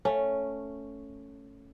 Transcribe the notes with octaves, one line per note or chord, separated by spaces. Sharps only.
A3 C#4